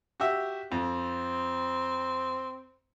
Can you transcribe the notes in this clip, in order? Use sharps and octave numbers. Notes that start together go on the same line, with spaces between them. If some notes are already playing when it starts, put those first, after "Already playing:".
F#4 G4 E5
F2 C4